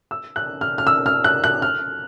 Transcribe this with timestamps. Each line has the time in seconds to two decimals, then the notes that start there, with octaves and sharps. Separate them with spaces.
0.11 E6
0.36 F#6
0.61 F6
0.78 F6
0.87 E6
1.06 F6
1.24 F#6
1.44 F#6
1.62 F6